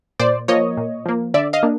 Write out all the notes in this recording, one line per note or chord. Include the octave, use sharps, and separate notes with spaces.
A#2 C5 D5
F3 A#3 C#5 D#5
A#2
F3 A#3
D3 D5 E5
D#5 F5
A#3 D4